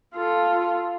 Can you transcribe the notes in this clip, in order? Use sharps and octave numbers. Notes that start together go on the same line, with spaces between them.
F4 A4